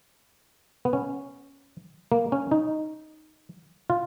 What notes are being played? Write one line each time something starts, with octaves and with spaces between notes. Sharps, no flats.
B3
C#4
A#3
C#4
D#4
F4